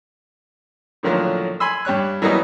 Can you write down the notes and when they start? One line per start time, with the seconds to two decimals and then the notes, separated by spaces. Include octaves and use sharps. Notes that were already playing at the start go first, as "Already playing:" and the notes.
1.03 A2 D3 D#3 F3 F#3 A#3
1.60 G#5 B5 C6 E6
1.85 G2 G4 C#5 F#6
2.22 E3 F#3 G3 A#3 B3 D#4